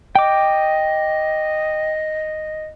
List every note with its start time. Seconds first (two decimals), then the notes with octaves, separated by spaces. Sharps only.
0.15 D#5 G5 D6